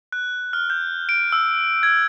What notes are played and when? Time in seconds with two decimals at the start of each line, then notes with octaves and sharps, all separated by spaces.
0.12 F#6
0.53 F6
0.70 G6
1.09 D7
1.32 E6
1.83 G#6